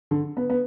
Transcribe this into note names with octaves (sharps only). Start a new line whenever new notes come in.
D3
B3
B3